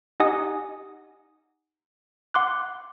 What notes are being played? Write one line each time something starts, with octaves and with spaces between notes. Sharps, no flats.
D#4 G4 D#5 F#5 G#5 D#6
F#5 C6 D6 F#6